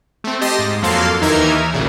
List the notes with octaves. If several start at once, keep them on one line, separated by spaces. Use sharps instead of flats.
A3 C4
G4 D#5 A5 C6 A#6
G#2
F2 F#3 A#3 A4 F5 C6
D#2 E3 D#4 A#4 E5 G#6
A1 D2 A#2 C#3